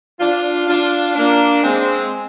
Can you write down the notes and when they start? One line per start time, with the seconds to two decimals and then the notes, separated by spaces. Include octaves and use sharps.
0.20 D4 F4
0.67 D4 F4
1.16 A#3 D4
1.63 G#3 C4